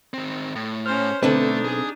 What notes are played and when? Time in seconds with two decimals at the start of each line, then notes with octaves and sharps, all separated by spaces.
0.14 D#3 C4
0.55 A2
0.86 C#4 C5 F6
1.23 B1 D3 A3 C4 D4 D#4 B4
1.65 G#4 G#5